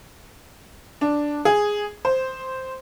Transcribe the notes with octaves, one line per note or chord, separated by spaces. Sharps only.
D4
G#4
C5